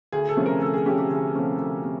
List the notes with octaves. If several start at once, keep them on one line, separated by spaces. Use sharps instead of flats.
D2 G#4
A4
C3 F3 A3 C#4
A#4
D2 A4
G#4
C3 F3 A3 C#4 G4
G4
D2 G#4
C3 F3 A3 C#4
D2
C3